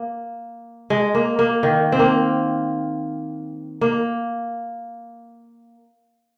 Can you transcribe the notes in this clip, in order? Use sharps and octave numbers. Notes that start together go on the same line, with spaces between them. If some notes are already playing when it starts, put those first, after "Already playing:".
Already playing: A#3
G#3
A#3
A#3
D#3
C4
A#3
A#3